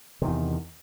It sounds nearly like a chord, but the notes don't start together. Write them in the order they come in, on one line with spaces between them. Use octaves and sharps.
C3 D#3 E2